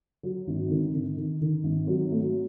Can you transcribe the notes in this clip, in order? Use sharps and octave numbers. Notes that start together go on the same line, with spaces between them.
F#3
G#1
D#3
D#3
D#3
D#3
G#1
F#3
A3